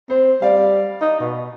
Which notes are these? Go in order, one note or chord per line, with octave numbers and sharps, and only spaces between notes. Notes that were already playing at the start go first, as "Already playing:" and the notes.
C4 C5
G3 D5 F5
D#4
B2